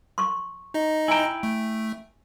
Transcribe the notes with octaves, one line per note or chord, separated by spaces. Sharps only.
C6 C#6
D#4 D#5
E4 G5 G#5 A#5
A3